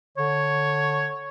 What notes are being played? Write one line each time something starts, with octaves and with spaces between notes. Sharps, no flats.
D3 C#5